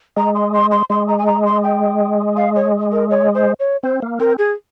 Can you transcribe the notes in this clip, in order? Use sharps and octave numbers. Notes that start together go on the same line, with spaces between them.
G#3 A#5
C6
C6
C6
G#3 C6
A#5
G#5
A#5
C6
G5
F5
C#5
A#4
C#5
C5
C#5
C4 C5
A#3
C4 A#4
G#4